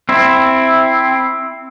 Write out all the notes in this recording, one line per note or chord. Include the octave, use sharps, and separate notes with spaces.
C4 E4